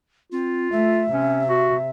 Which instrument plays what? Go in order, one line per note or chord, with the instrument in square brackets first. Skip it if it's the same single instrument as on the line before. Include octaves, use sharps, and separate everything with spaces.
[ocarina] C4 [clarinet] F4
[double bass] A3 [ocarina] E5
[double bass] C3 [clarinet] C#4
[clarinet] F#4